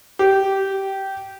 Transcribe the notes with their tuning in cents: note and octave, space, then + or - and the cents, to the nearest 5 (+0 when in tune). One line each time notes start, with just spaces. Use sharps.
G4 -15